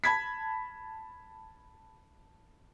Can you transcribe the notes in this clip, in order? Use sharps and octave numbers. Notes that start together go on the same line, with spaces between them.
A5 B5 G#6 B6